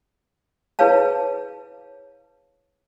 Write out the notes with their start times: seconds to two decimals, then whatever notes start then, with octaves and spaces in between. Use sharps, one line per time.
0.79 E4 G#4 B4 C#5 F5 A5